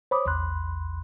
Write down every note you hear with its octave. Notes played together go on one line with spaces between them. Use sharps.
C5 C#5 B5 D6 D#6
A#1 E2 B5 C6 F#6